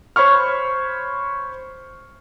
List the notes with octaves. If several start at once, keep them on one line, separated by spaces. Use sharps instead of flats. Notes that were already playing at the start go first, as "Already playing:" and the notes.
C5 C#5 B5 C#6 F6